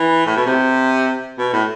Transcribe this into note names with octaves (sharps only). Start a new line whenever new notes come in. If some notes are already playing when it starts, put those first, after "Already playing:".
Already playing: E3
A2
B2
C3
B2
A2